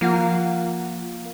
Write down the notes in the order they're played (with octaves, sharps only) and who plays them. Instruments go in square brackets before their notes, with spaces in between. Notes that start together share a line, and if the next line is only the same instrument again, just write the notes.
[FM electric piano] F3 F4 F#5 [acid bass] A#3